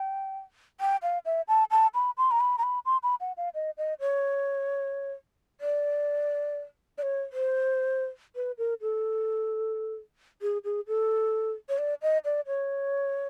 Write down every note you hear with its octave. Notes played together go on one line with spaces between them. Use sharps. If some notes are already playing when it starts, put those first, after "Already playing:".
Already playing: G5
G5
F5
E5
A5
A5
B5
C6
A#5
B5
A#5
B5
C6
B5
F#5
F5
D#5
D#5
C#5
D5
D5
C#5
C5
B4
A#4
A4
G#4
G#4
A4
C#5
D5
D#5
D5
C#5